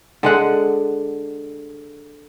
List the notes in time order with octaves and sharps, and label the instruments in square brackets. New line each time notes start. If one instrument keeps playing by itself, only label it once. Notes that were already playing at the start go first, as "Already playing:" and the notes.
[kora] D3 G#3 F#5